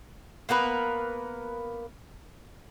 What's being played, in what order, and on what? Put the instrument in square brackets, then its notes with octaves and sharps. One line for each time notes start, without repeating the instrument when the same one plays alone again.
[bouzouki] A#3 B3 A#4 B4